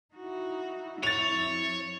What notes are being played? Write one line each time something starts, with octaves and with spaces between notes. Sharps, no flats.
D#4 E4 F#4
F2 C#5 A6 F7